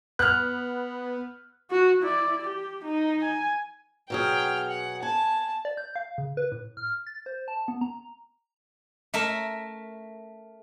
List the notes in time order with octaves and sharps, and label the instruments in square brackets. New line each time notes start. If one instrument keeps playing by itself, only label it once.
[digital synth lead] B3 [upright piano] F6 F#6
[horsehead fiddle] F#4
E4 D5
G4
D#4
G#5
[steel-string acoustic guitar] B2 F#3 G#4 [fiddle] G5 F6
[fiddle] F#5
[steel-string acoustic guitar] G#5 [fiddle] A5
[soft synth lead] D5
G6
F5
C#3
B4
A2
F6
A6
C5
A5
B3
A#5
[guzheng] A3 A#4 E5